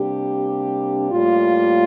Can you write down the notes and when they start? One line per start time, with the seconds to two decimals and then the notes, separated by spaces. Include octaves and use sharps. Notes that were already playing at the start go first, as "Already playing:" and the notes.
Already playing: C3 G3 A#3 D4 G4
1.11 A2 G3 A#3 F4